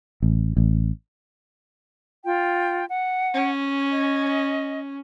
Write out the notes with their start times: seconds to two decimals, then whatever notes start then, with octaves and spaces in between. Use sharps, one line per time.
0.22 A1
0.57 A1
2.25 F4 G5
2.88 F#5
3.34 C#4
3.92 D#5